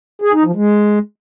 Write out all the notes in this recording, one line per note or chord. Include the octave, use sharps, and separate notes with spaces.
G#4
D#4
F3
G#3